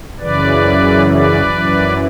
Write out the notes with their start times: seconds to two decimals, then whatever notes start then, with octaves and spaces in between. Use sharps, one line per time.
0.20 F#2 C#3 E3 B4 D5
1.11 B4 D5
1.41 F#2 E3